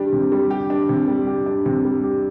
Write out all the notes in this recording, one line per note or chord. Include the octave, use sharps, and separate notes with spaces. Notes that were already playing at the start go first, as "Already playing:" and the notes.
Already playing: G3 D4 G4
C3
G3
G4
D4
C3
G3
G4
D4
C3
G3
G4